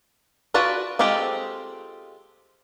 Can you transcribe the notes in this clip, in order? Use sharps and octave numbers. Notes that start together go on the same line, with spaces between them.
F4 F#4 B4 D5 A5
G#3 C4 F4 G4 A4